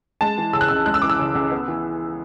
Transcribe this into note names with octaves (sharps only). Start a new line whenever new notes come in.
G#3 A5
E3
C#3 E6
F#6
C#2 E6
G#3 F#6
E6
E3 D6
E6
C#3
C#2
B3
E3